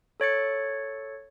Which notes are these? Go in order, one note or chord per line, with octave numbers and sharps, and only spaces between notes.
A4 C#5 A6 C#7